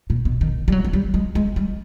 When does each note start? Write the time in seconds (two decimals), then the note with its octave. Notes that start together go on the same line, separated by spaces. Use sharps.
0.10 A#2
0.25 B2
0.41 D#3
0.68 G3
0.72 F#3
0.85 G#3
0.93 G3
1.14 G#3
1.35 G#3
1.56 G3